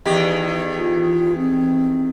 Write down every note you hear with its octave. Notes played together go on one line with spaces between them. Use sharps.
E2 D#3 G4
F4
C4